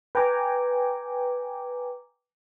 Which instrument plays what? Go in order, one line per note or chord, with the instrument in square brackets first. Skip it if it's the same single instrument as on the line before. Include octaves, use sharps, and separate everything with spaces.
[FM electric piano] B4 G5 G#5 A#5 D6